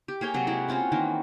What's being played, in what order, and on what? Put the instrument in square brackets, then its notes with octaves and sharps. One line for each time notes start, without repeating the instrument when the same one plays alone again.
[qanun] G4
A#3 G#4 C#5 G5
C3 F#3 F#4
G#3 E4 F#4
C4 C#4 F4 F#4
D#3 E3 A#3